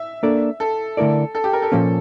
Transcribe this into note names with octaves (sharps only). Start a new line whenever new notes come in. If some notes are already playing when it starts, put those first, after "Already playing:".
Already playing: E5
A#3 D4 A4 D5
A4
D3 A3 E4 A#4 D5
A4
G4
A#4
A4
A#2 F3 A#3 C#4